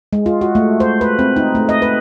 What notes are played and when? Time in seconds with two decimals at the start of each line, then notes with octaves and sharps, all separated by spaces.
0.13 G#3
0.26 F4
0.41 F#4
0.55 A3
0.80 C5
1.01 B4
1.19 C4
1.36 D#4
1.55 A3
1.69 D#5
1.82 B4